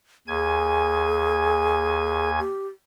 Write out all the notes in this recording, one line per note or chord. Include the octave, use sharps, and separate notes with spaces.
D#2 G#4 G#5 G#6
G4